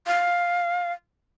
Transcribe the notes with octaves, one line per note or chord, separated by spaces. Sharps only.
F5